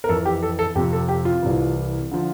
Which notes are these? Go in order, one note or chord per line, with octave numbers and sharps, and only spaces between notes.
A#4
F2 E3 A4
G4
A4
A4
F2 C3 F3 G4
A4
G4
F4
C2 C3 E3
D3 F3